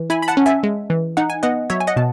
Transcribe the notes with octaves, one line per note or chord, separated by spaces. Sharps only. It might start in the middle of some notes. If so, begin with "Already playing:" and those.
Already playing: E3
E4 G#5 B5
B5
F#5 A5
C#4
E5 G#5
G#3
E3
D#4 F#5
G#5
B3 D#5 F#5
F#3 C#5 E5
G#5
D#5 F#5
B2 A5